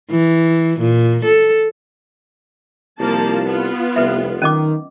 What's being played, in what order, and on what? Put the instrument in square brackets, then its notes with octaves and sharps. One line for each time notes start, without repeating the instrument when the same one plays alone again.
[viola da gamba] E3
A#2
A4
[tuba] C2 [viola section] F3 A#3 A5
[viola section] B3 F4
[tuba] F1 [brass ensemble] C2 G3 [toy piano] B4 E5
[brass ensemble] D#3 [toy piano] C#4 D#5 D6